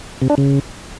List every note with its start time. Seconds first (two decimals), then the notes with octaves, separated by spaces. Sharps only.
0.22 C3
0.30 D4
0.38 C#3